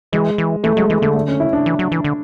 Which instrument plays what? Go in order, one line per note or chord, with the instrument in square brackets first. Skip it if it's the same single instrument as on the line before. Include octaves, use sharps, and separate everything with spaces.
[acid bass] E3 [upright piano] G#3
[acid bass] E3
[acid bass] E3 [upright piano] A3
[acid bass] F#3 [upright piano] G#3
[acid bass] E3 [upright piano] G#3
[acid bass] D3 [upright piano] A3
[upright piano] A3
C#4
E4
D4
[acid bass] E3
F#3
E3
D3